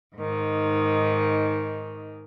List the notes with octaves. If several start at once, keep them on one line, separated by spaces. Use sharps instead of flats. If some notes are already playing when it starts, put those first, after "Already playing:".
G#2 D#3